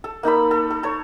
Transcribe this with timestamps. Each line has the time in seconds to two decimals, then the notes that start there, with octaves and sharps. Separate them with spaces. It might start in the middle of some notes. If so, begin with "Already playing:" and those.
0.04 A4
0.23 A#3 D#4 A4 B5
0.51 A4
0.71 A4
0.83 A4 C#5